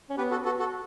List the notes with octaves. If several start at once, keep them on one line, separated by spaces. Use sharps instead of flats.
C#4
B3 G4 B4
F#4 A4
F#4 A4
F#4 A4